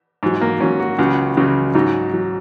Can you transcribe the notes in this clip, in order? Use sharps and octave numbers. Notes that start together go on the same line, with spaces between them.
G#2 F#3
A#3
G#2 F#3 C#4
F#4
C#2 C#3 F#3
C#2 C#3 F#3
G#2 F#3 D#4
F#3